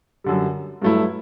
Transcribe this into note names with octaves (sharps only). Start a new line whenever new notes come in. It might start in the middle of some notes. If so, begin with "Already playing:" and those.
F#2 D3 G3
G2 F#3 A3 E4